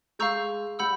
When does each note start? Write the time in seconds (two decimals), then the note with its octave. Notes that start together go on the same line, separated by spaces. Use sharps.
0.19 G#3 F5 A#5 C#6 E6 G6
0.79 G3 F#5 B5 E6 G6